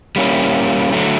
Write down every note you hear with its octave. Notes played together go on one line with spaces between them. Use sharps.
G3 A#3 C#4 E4
D3 F#3 A3